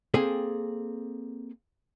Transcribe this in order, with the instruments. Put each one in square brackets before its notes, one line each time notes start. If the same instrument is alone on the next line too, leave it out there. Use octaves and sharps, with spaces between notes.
[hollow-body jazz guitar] A#3 C4 G#4 A4 G5 G#5